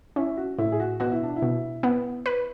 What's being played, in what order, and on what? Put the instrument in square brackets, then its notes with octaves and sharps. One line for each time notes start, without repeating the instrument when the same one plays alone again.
[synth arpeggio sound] C#4 [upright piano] E4
[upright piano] F#4
[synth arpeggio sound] A2 [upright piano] E4
[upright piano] G#4
F#4
[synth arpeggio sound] B2 [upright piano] F#4
[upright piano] E4
D4
E4
[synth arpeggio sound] B2
B3
B4